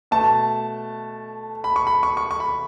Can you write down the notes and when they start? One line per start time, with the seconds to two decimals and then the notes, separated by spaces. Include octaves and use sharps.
0.11 B2 A3 A5
1.64 B5
1.76 C#6
1.87 B5
2.03 C#6
2.17 C#6
2.31 C#6
2.40 B5